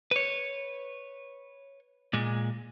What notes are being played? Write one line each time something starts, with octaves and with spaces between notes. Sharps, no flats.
B4 C#5
A#2 G#3